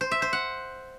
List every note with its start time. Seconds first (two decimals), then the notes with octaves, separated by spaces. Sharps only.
0.01 C5
0.11 E5
0.22 C5
0.33 F#5